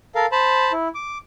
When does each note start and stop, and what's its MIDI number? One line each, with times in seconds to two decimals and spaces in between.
0.15 0.26 69
0.15 0.26 70
0.15 0.26 77
0.32 0.72 72
0.32 0.72 81
0.32 0.72 83
0.72 0.88 64
0.95 1.18 86